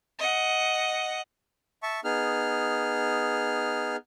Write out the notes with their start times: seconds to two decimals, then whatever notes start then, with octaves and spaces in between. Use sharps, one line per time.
0.19 D#5 F#5
1.83 E5 A5 C#6
2.04 B3 D#4 G#4 F6